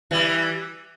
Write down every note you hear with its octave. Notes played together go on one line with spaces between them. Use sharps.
E3 G3